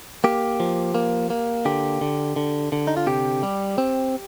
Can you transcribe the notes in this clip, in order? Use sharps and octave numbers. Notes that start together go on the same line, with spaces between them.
A#3 G4
F3
A#3
A#3
D3 G4
D3
D3
D3
D#4
F4
C3 G4
G3
C4